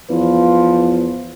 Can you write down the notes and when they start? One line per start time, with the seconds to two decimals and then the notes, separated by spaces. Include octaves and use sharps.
0.10 E2 F3 B4